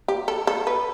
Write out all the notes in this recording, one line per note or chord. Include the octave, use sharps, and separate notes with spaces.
G4
A4
A4
B4